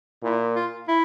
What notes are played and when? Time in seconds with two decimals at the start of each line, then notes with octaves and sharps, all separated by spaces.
0.23 A#2 E4
0.56 F4
0.88 E4